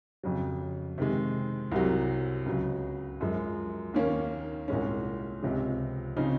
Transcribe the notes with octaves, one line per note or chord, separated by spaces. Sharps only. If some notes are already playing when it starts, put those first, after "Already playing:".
F2 C#3 F#3
C3 D#3 G#3
C2 C3 F#3
C#2 C#3 F#3
F#2 F3 G#3
D#2 D#3 A#3 C#4
C2 A#2 G#3 C#4
C#2 C3 F3 G#3 C#4
C#3 F3 C4 D#4